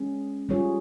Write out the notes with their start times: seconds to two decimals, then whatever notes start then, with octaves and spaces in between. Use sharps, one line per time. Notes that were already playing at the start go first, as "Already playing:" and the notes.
Already playing: G#3 C#4 G#4
0.49 G3 C#4 F4 G#4 C#5